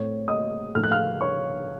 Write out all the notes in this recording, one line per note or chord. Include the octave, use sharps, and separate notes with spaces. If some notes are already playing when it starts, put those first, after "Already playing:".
Already playing: A2 A3 C4 C#5
D#5 D#6
A2 F3 A3 F6
F#6
F5 F6
C#5 C#6